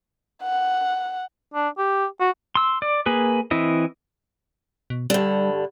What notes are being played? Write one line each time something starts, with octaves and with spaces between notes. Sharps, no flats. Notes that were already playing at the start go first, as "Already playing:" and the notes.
F#5
D4
G4
F#4
C6 E6
D5
A#3 G#4 B4
E3 C4 E4 D#5
B2
G2 D3 G3